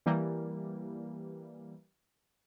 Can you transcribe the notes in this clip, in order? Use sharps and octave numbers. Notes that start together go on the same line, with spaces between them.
E3 G3 A#3